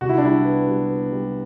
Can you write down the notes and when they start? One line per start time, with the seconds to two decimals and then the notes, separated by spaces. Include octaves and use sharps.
0.01 C2 F#4
0.09 E4
0.18 D4
0.23 G3 E4
0.45 B3
0.68 G3
0.90 B3
1.12 G3